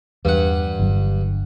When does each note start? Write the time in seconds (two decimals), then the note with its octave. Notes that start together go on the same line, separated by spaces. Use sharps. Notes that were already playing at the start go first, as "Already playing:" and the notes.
0.25 E2 G2 F#5
0.79 G1 F#3